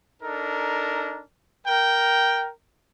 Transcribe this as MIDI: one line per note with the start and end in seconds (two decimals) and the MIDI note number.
0.23 1.21 62
0.23 1.21 63
0.23 1.21 69
0.23 1.21 70
1.66 2.50 70
1.66 2.50 79